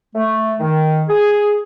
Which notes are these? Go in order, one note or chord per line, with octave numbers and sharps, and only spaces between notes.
A3
D#3
G#4